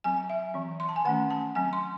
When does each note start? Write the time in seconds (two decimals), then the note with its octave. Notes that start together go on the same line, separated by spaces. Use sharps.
0.04 F#3 C4 G#5
0.30 E5
0.54 E3 C4
0.80 C6
0.89 A5
0.96 G#5
1.05 D#3 A3 C#4 F#5
1.31 A5
1.55 F#3 C4 G#5
1.73 C6